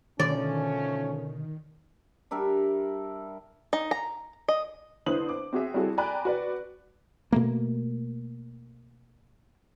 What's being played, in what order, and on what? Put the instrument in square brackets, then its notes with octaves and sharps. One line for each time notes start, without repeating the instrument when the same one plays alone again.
[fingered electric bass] B2 D3 [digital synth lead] D#3 [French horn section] F3 A3 C#4 [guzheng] D5
[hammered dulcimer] G3 D4 A#4 E5
[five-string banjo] D#4
A#5
D#5
[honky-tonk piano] D3 E4 B4 C5 D#6 F#7
D6
C4 F#4 G#4 E5
G3 C4 E4 F#4 G#4 A4
D5 G5 G#5 A#5 B5 F#6
F#4 B4 D5
[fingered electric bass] B2 A3 A#3